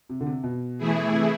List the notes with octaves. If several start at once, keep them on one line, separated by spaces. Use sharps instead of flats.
C3
D3
C3
B2
E3 A3 E4 G#4
C3